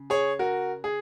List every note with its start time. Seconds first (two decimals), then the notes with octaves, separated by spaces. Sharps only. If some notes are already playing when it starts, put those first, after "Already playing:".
Already playing: C#3
0.10 G#4 C#5
0.39 F#4 A#4
0.84 G#4